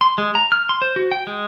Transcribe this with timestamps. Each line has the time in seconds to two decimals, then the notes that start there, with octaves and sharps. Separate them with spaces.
0.01 C6
0.18 G#3
0.35 A#5
0.52 F6
0.69 C6
0.82 C5
0.96 F#4
1.11 G5
1.27 G#3